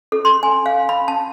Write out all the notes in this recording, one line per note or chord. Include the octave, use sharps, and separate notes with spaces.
A4
C6
G#5
F5
B5
A5